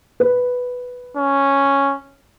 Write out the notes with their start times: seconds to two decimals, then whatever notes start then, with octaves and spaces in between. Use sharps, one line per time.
0.20 B4
1.17 C#4